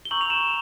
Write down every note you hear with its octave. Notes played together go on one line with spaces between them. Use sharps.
G7
A#5 C#6 E6 G6 F#7
F7
E7